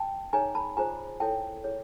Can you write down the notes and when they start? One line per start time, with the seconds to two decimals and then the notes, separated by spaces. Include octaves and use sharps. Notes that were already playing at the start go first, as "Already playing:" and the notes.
Already playing: G5 A5
0.33 D#4 G#4 C#5 G#5 A#5
0.55 A5 B5
0.77 F4 G#4 C5 G#5 A#5
1.20 E4 A4 C#5 G5 A5
1.64 E4 G#4 C#5